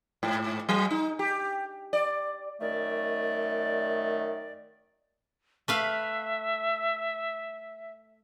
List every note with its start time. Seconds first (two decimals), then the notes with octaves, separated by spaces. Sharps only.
0.23 G#2
0.69 F#3
0.90 D#4
1.19 G4
1.93 D5
2.60 F#2 D#3 A3 D5
5.68 A3 B4 E5 F5